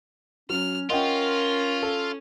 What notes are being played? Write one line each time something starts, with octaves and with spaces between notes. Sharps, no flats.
F#3 C#4 F6
C#4 F4 A#4 D#5 F#5 G5
A4